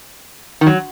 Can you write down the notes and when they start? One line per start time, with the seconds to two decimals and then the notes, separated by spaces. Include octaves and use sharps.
0.61 D#3
0.66 F#3